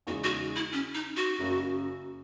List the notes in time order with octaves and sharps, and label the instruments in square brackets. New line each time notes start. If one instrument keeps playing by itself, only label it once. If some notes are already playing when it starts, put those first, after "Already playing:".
[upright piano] E2 C#3 G#3 D#4 G#4 [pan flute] F#4
[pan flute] F#4
E4
C#4
D#4
F#4
[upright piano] F#1 F#2 C#3